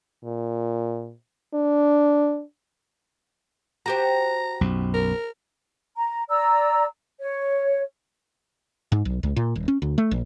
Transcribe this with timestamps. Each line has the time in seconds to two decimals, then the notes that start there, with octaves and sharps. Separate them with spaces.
0.24 A#2
1.54 D4
3.86 F#4 G4 C5 A#5
4.61 B1 F#2
4.94 A#4
5.95 A#5
6.30 D5 A#5 E6
7.20 C#5
8.92 G#2
9.05 B1
9.23 C#2
9.36 A#2
9.56 D#1
9.68 C#4
9.82 D2
9.98 A3
10.11 A#1